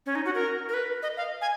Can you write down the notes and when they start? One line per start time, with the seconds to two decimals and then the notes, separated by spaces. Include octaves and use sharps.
0.06 C#4
0.15 D#4
0.25 F#4
0.35 A#4
0.69 A#4
0.74 B4
1.03 D#5
1.17 F5
1.42 G#5